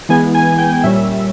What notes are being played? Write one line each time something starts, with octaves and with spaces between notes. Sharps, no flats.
E3 G#3 B3 G#5
G#5
G5
A#2 G3 C#4 E5